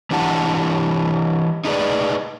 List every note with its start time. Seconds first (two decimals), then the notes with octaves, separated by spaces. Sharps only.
0.11 E3 D4 E4 G4 F#5 A5
1.65 D#4 E4 G#4 A4 B4 D5